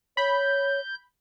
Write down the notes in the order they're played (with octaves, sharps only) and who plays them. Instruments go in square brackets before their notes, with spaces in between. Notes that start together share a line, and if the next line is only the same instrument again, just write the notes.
[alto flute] C#5 [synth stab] B5 [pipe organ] G6